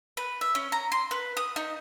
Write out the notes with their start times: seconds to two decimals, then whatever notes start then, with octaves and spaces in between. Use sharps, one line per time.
0.17 B4
0.41 E5
0.55 C#4
0.72 A#5
0.92 C6
1.11 B4
1.37 D#6
1.56 D#4